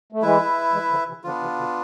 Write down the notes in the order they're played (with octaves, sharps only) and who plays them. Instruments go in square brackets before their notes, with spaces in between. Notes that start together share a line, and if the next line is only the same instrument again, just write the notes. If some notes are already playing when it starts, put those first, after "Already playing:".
[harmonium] A3
[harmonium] E3 G#3 [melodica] E4 B4 E5
[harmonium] E3 G#3
D3 F3
C3 E3
[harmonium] D3 F3 [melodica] B3 D4 F4
[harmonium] C3 E3
B2 D3